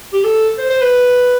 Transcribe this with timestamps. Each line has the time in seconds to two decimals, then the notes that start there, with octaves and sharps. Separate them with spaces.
0.13 G4
0.24 A4
0.58 C5
0.70 C5
0.81 B4